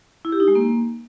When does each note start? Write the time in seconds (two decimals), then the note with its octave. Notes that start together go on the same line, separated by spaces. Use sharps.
0.25 E4
0.32 G4
0.40 D#4
0.48 G#3
0.55 A#3